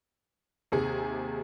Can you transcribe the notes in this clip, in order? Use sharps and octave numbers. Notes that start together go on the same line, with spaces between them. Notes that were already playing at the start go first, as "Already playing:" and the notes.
D#2 C3 G#4